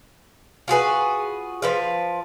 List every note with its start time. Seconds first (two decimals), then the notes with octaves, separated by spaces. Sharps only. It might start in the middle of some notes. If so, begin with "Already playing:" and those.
0.68 F4 F#4 G#4 B4
1.62 F3 B4 F5